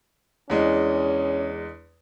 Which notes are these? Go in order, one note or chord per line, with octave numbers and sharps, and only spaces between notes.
E2 G#3 C#4 D4